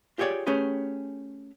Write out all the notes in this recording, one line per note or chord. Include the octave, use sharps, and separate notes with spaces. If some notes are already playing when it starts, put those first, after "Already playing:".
F4 G4 G#4 C#5 D5
A3 C#4 G4 G#4 B4